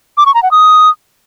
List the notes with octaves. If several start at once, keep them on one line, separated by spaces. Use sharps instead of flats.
D6
C#6
A#5
F#5
D#6